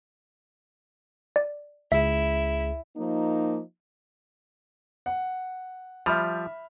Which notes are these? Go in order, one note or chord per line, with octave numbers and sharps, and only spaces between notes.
D5
C#2 E4 G#4 E5
F3 A#3 D#4
F#5
F3 G3 E5 B5 F6